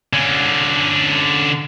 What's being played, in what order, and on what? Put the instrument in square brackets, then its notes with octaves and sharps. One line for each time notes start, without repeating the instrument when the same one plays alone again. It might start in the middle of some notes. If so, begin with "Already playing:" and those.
[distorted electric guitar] D3 C#4